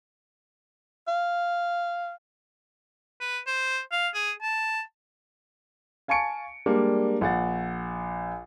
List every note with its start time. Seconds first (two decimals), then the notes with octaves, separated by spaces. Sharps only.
1.08 F5
3.21 B4
3.47 C5
3.92 F5
4.14 G#4
4.42 A5
6.08 F5 G#5 A5 C#6 C#7 D7
6.66 G3 G#3 A#3 D4
7.21 A#1 F#5 A6